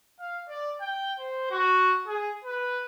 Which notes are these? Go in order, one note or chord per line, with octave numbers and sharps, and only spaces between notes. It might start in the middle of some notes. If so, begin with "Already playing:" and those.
F5
D5
G5
C5
F#4
G#4
B4